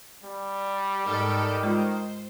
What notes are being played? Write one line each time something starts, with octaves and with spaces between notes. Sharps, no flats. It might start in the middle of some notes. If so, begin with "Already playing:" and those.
G3
G#2 D#3 G4 A4
G#3 F4 C5